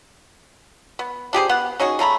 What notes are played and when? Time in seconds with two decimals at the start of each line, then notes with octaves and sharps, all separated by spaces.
0.99 B3
1.33 D4 G4 G#4 C5
1.49 B3 F#5
1.80 C#4 D#4 F#4 G#4
1.99 C#3 A3 A#5 B5